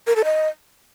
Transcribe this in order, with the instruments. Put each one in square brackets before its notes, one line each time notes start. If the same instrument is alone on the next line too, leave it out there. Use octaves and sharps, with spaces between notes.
[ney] A#4
A4
D#5